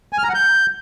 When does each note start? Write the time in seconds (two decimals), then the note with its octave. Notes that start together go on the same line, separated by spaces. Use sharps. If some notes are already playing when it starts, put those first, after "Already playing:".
0.13 G#5
0.18 F6
0.24 A#5
0.29 F#5
0.35 G6